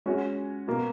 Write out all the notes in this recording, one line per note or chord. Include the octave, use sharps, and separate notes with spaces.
G#3 C#4 F#4 C#5
B2 A#3